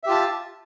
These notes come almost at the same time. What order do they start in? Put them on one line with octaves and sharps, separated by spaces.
E5 G4 F4 A5